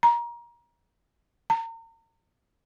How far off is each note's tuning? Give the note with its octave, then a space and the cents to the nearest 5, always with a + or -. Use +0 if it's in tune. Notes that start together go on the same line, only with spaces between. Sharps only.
A#5 +25
A#5 -35